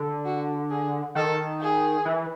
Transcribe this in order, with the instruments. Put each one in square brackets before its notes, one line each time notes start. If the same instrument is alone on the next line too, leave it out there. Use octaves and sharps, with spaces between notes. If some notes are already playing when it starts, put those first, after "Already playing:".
Already playing: [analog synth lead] D3
[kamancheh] F#4
G#4
[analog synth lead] D#3 [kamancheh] A4
[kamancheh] G#4
[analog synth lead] E3